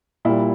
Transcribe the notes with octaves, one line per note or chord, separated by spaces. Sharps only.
A#2 G3 E4